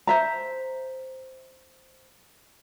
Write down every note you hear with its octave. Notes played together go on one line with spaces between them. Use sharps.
C5 E5 A#5